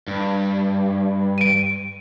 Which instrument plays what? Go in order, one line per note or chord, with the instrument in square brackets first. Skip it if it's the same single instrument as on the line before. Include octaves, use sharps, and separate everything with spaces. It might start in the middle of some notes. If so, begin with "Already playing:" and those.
[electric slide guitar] G2
[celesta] D7 D#7